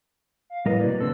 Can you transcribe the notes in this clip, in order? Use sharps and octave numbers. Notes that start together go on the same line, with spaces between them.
F5
A2 G3 A#4 B4 D#5
C3 F#3 A#3 D5
D3 C4 A4 E6